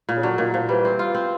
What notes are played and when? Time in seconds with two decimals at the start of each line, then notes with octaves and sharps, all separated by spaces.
0.09 A#2
0.17 C#3
0.23 D3 F#3
0.38 A#2 D#3
0.54 A#2 F3
0.69 E3 G3
0.85 C4
0.99 F4
1.14 C4